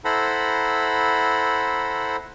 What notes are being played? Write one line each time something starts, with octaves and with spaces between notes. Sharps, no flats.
E4 A4 C5 F#5 A#5 B5